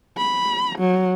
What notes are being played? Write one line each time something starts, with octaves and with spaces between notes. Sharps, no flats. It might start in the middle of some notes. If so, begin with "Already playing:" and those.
B5
F#3